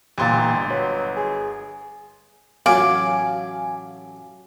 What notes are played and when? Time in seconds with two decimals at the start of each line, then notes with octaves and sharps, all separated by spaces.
0.18 G1 A#2 E3 G4 C6 A6
0.70 F#3 B4
1.16 G#4
2.66 A1 F#3 F4 F5 G#5 D6